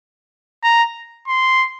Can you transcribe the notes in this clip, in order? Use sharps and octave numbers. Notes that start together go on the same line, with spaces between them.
A#5
C6